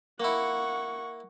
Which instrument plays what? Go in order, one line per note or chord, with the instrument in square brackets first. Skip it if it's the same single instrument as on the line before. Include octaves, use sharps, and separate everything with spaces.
[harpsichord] A#3 E4 [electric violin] F#5 C#6